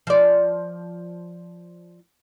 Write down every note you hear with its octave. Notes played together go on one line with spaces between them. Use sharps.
F3 D5